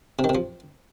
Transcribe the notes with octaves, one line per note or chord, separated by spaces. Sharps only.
C3
D#3
C3
F3